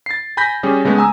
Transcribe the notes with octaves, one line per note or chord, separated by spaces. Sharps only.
A6 C7
G#5 B5 G6 A#6 B6
G3 C#4 G#4
C#3 G#3 A3 B3
G#5 A#5 D#6 E6